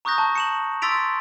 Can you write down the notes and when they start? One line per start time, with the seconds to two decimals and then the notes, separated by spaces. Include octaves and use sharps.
0.05 A#5 C#6 D#6 F#6 G6 A#6
0.18 A5
0.35 C#7 E7 F#7
0.82 C6 E6 A6 B6 D7 F7